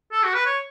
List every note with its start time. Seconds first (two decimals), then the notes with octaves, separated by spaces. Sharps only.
0.12 A4
0.23 F#4
0.34 B4
0.46 C#5